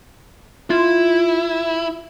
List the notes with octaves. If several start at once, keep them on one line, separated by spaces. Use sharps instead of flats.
E4 F4